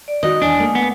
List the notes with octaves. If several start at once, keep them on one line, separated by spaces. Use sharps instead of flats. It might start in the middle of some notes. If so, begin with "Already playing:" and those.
D5
D#3 F#4 D#5
E2 D4 G#5 D#6
A3 A#3
B3